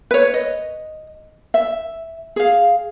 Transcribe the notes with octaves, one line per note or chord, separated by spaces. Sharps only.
B4 C#5
D#5
E5
G#4 F5